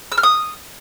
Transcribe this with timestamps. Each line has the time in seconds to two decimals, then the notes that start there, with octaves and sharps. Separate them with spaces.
0.12 E6
0.18 F6
0.23 D#6